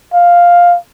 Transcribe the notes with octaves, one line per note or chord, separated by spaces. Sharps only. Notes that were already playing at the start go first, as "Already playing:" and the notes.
F5